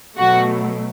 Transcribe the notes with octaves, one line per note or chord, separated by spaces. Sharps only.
B2 F#3 A3 F#4